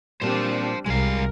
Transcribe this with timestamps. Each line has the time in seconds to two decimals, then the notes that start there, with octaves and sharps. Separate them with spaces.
0.22 A#2 G3 C4 D4 C5 A5
0.86 C2 G3 G#3 A#4 F5